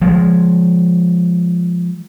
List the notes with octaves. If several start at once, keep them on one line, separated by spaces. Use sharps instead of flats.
F3 G#3